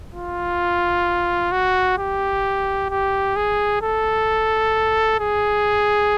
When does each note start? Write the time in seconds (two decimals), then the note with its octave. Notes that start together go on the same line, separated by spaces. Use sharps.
0.14 F4
1.52 F#4
1.98 G4
2.90 G4
3.36 G#4
3.82 A4
5.20 G#4